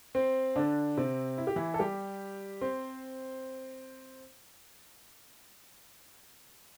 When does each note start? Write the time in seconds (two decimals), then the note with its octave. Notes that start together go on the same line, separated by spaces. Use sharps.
0.15 C4 C5
0.56 D3 D4
0.97 C3 C4
1.38 E4
1.47 G4
1.56 E3 E4
1.74 A4
1.80 G3 G4
2.61 C4 C5